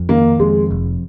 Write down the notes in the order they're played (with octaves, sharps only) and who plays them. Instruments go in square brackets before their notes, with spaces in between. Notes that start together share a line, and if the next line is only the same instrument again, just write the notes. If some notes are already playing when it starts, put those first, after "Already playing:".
Already playing: [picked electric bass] F2
[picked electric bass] D#3 [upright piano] A#3
[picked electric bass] F2 [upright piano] G#3
[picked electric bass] F1